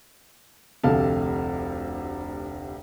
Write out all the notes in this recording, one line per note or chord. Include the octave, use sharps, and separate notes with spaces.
F1 D2 C3 A4 F5 A5